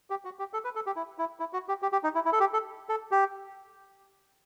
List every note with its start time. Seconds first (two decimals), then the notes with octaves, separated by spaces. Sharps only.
0.10 G4
0.25 F#4
0.39 G4
0.53 A4
0.64 B4
0.75 A4
0.86 G4
0.96 E4
1.18 E4
1.40 E4
1.53 F#4
1.69 G4
1.82 G4
1.92 G4
2.03 D#4
2.15 E4
2.25 E4
2.33 A4
2.40 G4
2.53 A4
2.89 A4
3.11 G4